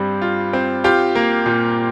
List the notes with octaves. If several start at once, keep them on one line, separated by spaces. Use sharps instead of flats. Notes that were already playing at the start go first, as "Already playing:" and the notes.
Already playing: G2 G3 C4
F4
C4
F4 G4
A#3
A#2